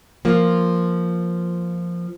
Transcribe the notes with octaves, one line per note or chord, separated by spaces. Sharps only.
F3 A#3 F4